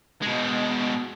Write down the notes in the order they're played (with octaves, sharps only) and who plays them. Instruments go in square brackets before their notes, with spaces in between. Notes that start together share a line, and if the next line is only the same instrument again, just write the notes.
[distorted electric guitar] B2 G#3